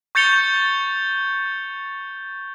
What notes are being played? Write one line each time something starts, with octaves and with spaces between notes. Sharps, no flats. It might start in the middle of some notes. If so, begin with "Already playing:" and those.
C#6 G6 A6 C#7 F7 G7